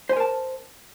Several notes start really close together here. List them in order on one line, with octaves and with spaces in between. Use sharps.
C5 G#5 A#4 A5